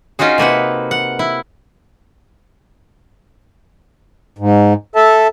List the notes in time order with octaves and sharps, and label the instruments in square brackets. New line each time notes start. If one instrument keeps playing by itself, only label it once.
[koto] C#4 D#4 F4 F#4 G#4
C3 A#3 B4 F#5
F#5
E4
[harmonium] G#2
A4 E5 A5